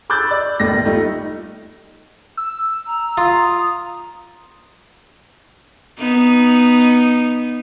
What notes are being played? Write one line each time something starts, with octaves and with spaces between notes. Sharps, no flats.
B5 D6 E6 F#6 G6 A6
D5
G1 D#2 A2 A#6
G3 A3 D#4 F4
E6
A#5
F4 D#6
B3 D#4